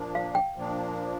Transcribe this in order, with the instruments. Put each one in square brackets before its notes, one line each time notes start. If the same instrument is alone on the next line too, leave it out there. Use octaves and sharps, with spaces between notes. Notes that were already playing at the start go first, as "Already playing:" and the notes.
Already playing: [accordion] A#2 F3 A#3 D4
[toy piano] F5
G5
[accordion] A#2 F3 A#3 D4